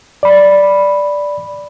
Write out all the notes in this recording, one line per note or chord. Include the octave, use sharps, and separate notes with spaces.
D5 B5